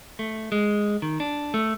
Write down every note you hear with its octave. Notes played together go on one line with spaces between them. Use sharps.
A3
G#3
D#3
D4
A3